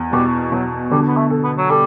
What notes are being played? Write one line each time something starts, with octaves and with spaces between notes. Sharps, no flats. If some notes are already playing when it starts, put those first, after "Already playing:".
Already playing: E2
B2 G3
B2 F#3
D3 G3
B3
A3
A4
B3
F#3
G3 A4